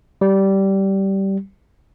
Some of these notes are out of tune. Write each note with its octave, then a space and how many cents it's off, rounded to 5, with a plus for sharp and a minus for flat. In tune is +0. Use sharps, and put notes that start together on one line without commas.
G3 -15